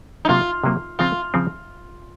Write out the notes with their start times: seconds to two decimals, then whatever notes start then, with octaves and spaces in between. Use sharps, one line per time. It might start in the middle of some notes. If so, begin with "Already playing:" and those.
0.25 D#4
0.29 C3 F#3 A#3 F4
0.64 C3 F#3 A#3
0.99 C#3 F3 C4 F4
1.34 C#3 F3 C4